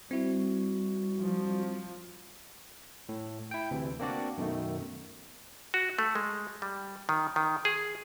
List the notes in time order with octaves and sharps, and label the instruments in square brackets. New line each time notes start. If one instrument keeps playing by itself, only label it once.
[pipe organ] G3 F#4 [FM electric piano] C4 E4
[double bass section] F3
[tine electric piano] A2
E4 G5
D2 C3 E3
A#3 C4 D4 F#4 D5
F#2 B2 D#3 A3
[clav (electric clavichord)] F#4
A3
G#3
G3
D#3
D#3
G#4